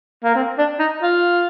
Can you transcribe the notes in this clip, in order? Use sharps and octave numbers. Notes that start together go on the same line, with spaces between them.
A#3
C4
D4
D#4
F4